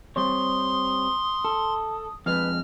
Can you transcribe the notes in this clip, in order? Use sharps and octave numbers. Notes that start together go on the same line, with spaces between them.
G3 C4 C#5 C6 D#6
A4
F2 G#3 B4 F6